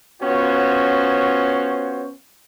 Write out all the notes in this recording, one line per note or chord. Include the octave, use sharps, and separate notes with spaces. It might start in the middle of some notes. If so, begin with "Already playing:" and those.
B3 C#4 F4 F#4 C5 C#5